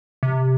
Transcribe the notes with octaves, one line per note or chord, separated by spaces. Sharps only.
C3